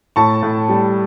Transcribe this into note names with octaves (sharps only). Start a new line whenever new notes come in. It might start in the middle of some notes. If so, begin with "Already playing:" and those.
A2 A5 C#6
A2
G3